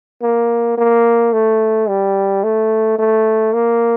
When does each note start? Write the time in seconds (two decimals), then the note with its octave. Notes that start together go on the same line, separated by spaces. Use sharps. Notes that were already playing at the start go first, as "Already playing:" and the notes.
0.22 A#3
0.78 A#3
1.33 A3
1.89 G3
2.43 A3
2.99 A3
3.54 A#3